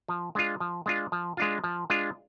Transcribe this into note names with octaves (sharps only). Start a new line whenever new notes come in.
F3
G#3 D4 F4
F3
G#3 D4 F4
F3
G#3 D4 F4
F3
G#3 D4 F4